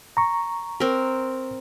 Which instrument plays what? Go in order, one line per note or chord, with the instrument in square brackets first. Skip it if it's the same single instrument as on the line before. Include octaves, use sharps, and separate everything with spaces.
[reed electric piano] A#5 C#6
[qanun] C4 A#4